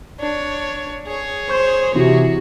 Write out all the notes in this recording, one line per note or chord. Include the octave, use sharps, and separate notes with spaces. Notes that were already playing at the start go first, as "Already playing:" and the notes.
D4 C#5
G#4 C#5
C5 C#6 G6
C3 E3 C4 E4 F#4